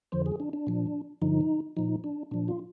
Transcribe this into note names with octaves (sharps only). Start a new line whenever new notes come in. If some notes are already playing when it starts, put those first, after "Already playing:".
F2 D3 F3 C5
G#4
D4
D4
A#2 F3
G2 D3 F3 D#4
A#2 F3 D#4
D4
A#2 F3 D4
F4